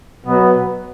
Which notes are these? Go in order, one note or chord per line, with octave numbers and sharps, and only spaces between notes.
B2 F#3 B3